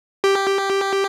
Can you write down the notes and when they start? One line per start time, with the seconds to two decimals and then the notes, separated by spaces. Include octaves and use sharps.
0.24 G4